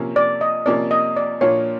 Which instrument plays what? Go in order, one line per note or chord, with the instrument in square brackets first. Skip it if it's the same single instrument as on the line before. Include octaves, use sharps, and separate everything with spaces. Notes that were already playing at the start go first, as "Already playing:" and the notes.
Already playing: [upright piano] C3 F3 A#3 C#4
[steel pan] D5
D#5
[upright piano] C3 F3 A#3 C#4 [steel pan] D5
[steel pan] D#5
D5
[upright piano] A#2 F3 A#3 D4 F4 [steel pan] C#5